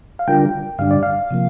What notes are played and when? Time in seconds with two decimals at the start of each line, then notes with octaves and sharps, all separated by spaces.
0.19 F5
0.28 D3 G3 D4 F4 A#4 G5
0.79 G2 D3 G3 D4 F5
0.91 D5
1.03 F5
1.31 C3 F3 A#3